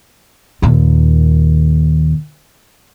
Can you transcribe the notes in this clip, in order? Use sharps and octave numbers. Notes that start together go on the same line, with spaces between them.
D#2 A#2